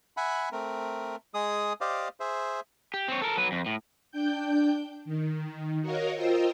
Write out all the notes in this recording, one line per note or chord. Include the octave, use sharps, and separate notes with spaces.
E5 F#5 G#5 B5
A3 C4 A#4
G#3 G#4 D#6
G4 C5 D5 D#5 F5
G#4 C5 E5
G4
C4 C#5
A4 A#4
F#3 B4
F2
A2
D4 G5 G6
D#3
F#4 A#4 C#5 D#5 F5
F4 A#4 C5 D#5 G5 E6